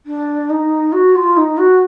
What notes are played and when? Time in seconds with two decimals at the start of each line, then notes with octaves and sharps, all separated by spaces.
0.06 D4
0.49 D#4
0.92 F#4
1.15 F4
1.36 D#4
1.57 F#4